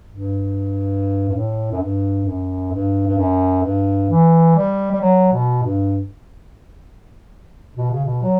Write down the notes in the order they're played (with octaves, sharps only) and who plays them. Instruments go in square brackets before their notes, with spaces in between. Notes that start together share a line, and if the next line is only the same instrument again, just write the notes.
[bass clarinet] G2
G2
A2
F#2
G2
F#2
G2
G2
F#2
G2
E3
G3
G3
F#3
B2
G2
B2
C#3
B2
F#3